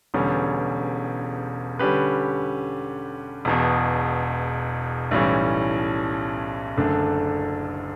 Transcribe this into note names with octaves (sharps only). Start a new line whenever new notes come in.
E1 E2 D3 G3 C#4
D3 G3 C#4 G4 B4
E1 E2 B2
B1 A2 E3 G3 C#4
F#1 F#2 D3 A3 D4